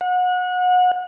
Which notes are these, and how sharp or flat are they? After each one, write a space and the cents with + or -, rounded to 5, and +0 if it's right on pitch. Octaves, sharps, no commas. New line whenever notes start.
F#5 -30